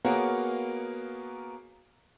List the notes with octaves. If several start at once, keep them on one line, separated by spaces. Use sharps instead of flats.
A#3 B3 F#4 G#4 A#4 C#5